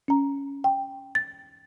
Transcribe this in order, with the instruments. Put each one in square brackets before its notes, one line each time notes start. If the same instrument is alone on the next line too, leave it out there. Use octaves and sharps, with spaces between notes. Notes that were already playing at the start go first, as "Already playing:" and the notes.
[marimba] C#4 A#5
G5
A6